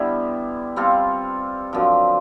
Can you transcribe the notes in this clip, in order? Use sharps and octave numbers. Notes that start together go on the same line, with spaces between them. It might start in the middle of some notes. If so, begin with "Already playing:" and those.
Already playing: D3 G3 B3 E4
G3 C4 F4 A4
F#2 D3 F3